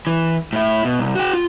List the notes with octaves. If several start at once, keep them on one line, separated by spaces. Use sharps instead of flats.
E3
A2 E4
B2
C2
F#4 G5
F4